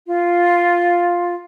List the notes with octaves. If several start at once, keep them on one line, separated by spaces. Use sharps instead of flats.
F4